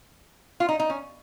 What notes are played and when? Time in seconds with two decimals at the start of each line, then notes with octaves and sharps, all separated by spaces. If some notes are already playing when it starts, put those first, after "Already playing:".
0.60 F4
0.69 D#4
0.80 D#4
0.90 C#4